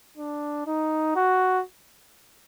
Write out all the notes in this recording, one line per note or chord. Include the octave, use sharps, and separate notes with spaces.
D4
D#4
F#4